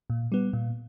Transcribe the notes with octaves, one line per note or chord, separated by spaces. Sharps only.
A#2
G3 B3
A#2